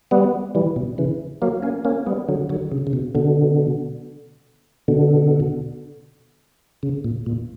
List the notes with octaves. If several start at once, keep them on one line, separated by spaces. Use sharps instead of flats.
G3 B3
E3 G3
B2
C#3 E3
F#3 A#3
A#3 C#4
A#3 C#4
G3 B3
D3 F#3
D3 F#3
C#3
C#3
B2
B2 D3
B2 D3
C#3
A#2
A#2